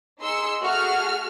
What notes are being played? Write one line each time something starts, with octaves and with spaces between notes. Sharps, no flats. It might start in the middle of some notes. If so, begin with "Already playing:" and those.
D#4 G#4 C6 E6 C#7
A3 F#4 G#4 F6